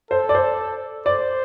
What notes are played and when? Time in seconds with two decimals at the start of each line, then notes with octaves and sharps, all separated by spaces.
0.11 A4 C5
0.29 D5
0.35 C5
1.06 C5 D5